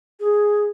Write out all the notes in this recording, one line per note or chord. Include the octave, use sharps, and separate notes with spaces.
G#4